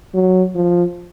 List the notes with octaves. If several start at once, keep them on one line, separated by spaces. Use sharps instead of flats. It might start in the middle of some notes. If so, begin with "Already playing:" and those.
F#3
F3